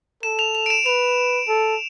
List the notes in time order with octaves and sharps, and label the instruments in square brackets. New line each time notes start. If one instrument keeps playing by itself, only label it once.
[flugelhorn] A4 [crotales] E7
[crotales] F7
F7
D7
E7
[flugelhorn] B4 [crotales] F7
[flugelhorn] A4